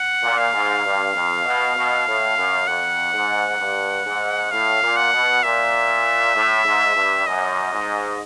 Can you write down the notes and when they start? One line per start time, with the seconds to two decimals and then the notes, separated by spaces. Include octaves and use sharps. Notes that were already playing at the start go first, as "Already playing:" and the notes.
Already playing: F#5
0.22 A#2
0.38 F5
0.53 G#2
0.84 G2
1.14 F2
1.45 B2
1.75 B2
2.07 A2
2.37 F#2
2.67 F2 F#5
3.14 G#2
3.59 G2
4.05 G#2
4.51 A2 F5
4.82 A#2
4.97 F#5
5.12 B2
5.43 A#2 E5
6.35 A2
6.65 G#2
6.95 G2
7.27 F#2 D#5
7.73 G#2